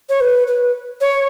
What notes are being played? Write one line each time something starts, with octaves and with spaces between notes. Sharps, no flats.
C#5
B4
B4
C#5